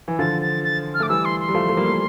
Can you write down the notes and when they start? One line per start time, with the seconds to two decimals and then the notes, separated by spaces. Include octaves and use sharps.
0.08 E3
0.19 D3 F3 A6
0.42 A6
0.64 A6
0.94 F6
1.00 A3 D6
1.09 E3 G3 E6
1.25 C6
1.40 C6
1.49 G3
1.55 F3 A3
1.69 A3
1.77 G3 A#3
1.92 A#3